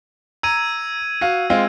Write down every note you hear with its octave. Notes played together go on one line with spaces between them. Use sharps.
A#5 E6 G#6 D#7
F#4 F5
G#3 C4 F4